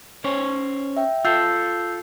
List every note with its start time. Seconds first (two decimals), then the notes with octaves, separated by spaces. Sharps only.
0.24 C#4 C5 C#5
0.97 E5 G5
1.25 F4 A4 E6 G6 C7